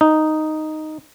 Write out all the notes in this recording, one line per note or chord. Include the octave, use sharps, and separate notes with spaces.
D#4